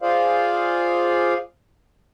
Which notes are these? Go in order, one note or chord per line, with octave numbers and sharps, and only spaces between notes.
F4 G#4 C5 D5 F5